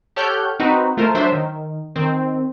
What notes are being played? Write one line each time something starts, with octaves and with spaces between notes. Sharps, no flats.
G4 A4 C#5 F#5 F6 G6
C4 D#4 F#4 B4
A3 F4 A#4 C5
F#3 D4 C5 E5
D#3
D#3 C4